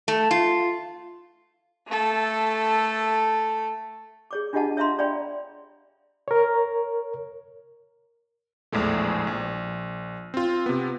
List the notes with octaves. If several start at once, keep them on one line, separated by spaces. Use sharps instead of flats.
A3
F4
A3 A4
G#4 C#5 D6
D4 F4 G4 D#5 F#5 A5
C#5 E5 F5 A#5 C6
C#5 D5 F5 G5 B5
A#4 C#5
A#1 E2 A2 G#3 A3
A#1
C4 F4
C3 B3